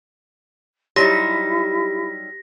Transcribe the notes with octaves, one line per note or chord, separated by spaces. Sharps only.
F#3 G3 D#4 E4 G4 A#6 B6